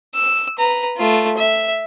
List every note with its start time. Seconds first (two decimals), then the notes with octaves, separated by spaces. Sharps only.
0.14 E6
0.59 B4 A#5
0.97 A3 F4
1.37 E5